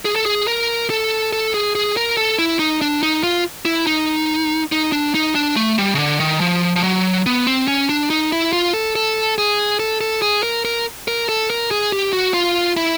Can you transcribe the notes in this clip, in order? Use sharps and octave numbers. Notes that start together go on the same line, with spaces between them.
G#4
A4
G#4
A#4
A4
A4
G#4
G#4
A#4
A4
E4
D#4
D4
D#4
F4
E4
D#4
D#4
D4
D#4
D4
A3
G3
C#3
D3
D#3
F3
F3
F#3
B3
C4
C#4
D4
D#4
E4
F4
A4
A4
G#4
A4
A4
G#4
A#4
A#4
A#4
A4
A#4
G#4
G4
F#4
F4
E4